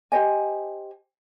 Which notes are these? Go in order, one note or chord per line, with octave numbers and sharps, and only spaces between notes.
G4 C5 D#5 G#5